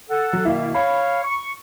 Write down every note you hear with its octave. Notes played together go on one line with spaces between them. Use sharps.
A4 F#5
F#3
B2 D#3 A#3 E4 F5
C#5 F5 B5
C#6